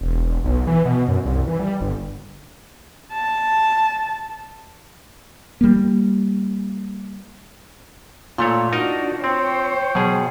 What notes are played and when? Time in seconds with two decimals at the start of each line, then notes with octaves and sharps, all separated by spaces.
0.01 E1
0.44 B1
0.67 E3
0.85 B2
1.08 F#2
1.25 C2
1.47 E3
1.59 G3
1.80 G1
3.13 A5
5.61 G3 A#3
8.38 A#2 A3 F4 C#5
8.73 D4 D#4 F#4 A#4 D#5
9.24 C4 C5 C#5 G5
9.95 B2 F#3 G#4